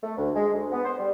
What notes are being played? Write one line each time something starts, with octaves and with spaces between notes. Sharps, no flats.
A3
D2
G#3
D2
B3
C5
G3